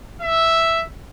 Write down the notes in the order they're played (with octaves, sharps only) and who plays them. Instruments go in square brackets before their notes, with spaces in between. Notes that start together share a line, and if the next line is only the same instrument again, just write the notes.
[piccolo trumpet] E5